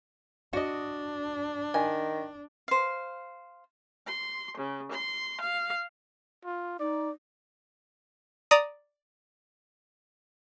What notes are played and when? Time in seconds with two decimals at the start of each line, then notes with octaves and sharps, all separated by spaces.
0.53 D4 F#4 D#5
1.74 D#3 G#5
2.68 C5 F5
4.07 C6
4.58 C#3
4.92 C6
5.42 F5
6.45 F4
6.79 D#4 D5
8.51 D5 A#5 D#6